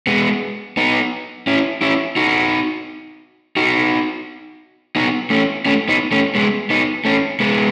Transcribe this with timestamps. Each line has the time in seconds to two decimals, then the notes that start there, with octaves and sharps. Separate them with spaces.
0.07 G#3 B3
0.77 B3 D#4
1.47 C#4 E4
1.82 C#4 E4
2.16 D#4 F#4
3.57 D#4 F#4
4.96 B3 D#4
5.30 A3 C#4
5.66 A3 C#4
5.89 B3 D#4
6.12 A3 C#4
6.35 G#3 B3
6.70 B3 D#4
7.05 A3 C#4
7.40 G#3 B3